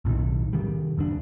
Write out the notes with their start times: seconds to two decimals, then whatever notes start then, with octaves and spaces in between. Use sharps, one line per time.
0.05 B1 A2 C3 D#3
0.53 C3 D#3 G3
0.98 F#1 D#2 A#2 D4